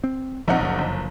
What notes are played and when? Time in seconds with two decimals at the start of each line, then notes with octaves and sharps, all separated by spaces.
0.04 C4
0.48 A#1 F3 G#3 C4 D#4 F#5
0.60 F#1 F#2 F3
0.78 G1